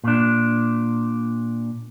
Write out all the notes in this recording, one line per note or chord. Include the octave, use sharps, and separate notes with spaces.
A#2 D4